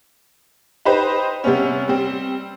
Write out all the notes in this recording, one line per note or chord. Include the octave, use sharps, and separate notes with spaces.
D#4 G4 B4 C5 D#5
C3 G3 B3 C#4
G3 C4